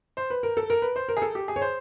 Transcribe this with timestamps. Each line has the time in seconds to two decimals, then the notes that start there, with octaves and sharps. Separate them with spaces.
0.17 C5
0.30 B4
0.43 A#4
0.57 A4
0.70 A#4
0.82 B4
0.96 C5
1.08 A#4
1.17 G#4
1.22 A4
1.35 G4
1.48 G#4
1.56 C#5
1.62 C5